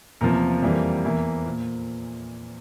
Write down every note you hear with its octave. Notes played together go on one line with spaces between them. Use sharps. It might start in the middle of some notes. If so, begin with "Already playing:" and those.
E2 C3 F3 A#3 A#4
F2 E3 G3 A#3
E2 E3 A#3
A#2